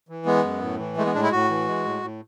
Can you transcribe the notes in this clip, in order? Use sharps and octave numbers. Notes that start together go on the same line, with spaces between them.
E3
G#3 B3
F#2
A2
E3
G#3 A3
B3
A2 D4
E4
A2 F#4
E3
G#3
A2
A2